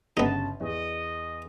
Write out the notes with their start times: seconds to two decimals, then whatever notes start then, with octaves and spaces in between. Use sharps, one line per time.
0.17 G1 C#3 B3 D#4 A5
0.61 E2 D#5